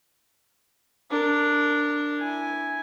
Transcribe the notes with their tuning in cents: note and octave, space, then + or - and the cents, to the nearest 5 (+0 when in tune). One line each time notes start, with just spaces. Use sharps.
D4 +0 A#4 -20
E4 -5 G#5 +0